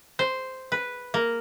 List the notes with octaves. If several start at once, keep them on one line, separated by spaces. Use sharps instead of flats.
C5
B4
A#3